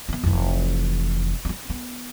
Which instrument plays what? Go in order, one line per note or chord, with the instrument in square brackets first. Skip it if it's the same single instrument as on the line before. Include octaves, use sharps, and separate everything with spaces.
[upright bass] B3 E4
F1 E3
C#4 D4
B3